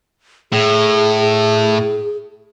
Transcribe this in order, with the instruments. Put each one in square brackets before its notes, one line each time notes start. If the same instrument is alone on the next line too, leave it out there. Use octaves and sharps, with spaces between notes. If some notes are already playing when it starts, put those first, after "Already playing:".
[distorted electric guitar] A2 [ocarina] G#4